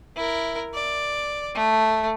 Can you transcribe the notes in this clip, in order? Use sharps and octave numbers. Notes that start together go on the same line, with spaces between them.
E4 A#4
D5
A3